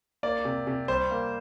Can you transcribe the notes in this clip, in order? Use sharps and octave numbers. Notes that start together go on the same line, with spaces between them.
A#3 D5
C3
C3
G3 C5
A#3